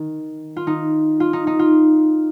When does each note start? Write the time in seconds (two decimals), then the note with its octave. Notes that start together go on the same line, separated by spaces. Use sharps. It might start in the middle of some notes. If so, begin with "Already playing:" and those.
Already playing: D#3
0.57 F4
0.67 D#4
1.20 F4
1.33 D#4
1.47 D#4
1.59 F4